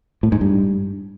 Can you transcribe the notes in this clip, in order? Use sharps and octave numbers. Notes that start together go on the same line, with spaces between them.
A2
G#2
G2